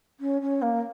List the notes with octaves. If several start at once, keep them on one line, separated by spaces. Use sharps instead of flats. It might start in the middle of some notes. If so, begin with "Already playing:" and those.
C#4
C#4
A#3